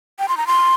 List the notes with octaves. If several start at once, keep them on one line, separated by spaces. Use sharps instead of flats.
G5
C6
A#5
C6